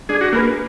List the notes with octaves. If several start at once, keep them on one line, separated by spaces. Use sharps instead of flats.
D4 G#4
F#4
A#3 G#4 B4